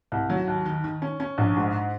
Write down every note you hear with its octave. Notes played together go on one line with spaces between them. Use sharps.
C2
F#3
D#2
D#3
D#3
C#4
C#4
A#1
G#2